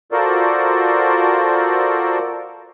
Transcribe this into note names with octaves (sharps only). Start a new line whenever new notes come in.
F4 F#4 A4 A#4 C5 D5